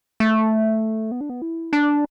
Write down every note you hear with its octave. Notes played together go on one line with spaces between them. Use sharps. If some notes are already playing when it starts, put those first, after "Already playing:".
A3
B3
D4
B3
E4
D4